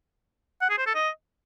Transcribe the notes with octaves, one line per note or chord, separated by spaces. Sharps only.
F#5
G#4
C5
A4
D#5